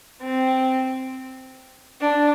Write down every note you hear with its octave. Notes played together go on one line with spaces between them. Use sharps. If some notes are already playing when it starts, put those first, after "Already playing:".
C4
D4